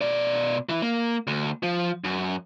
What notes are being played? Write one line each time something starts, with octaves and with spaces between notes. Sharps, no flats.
B2 D5
E3 E4
A#3
D2
F3
F#2